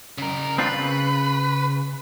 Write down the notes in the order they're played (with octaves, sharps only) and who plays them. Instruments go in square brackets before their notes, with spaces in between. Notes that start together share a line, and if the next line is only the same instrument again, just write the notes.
[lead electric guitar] C#3 A#4
[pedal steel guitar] C4 D4 F4 [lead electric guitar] B4
[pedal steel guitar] C#3